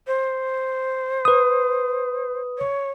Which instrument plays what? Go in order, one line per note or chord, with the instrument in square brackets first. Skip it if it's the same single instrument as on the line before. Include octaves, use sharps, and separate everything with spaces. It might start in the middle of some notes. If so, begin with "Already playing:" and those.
[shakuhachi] C5
[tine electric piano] B4 D#6
[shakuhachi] C#5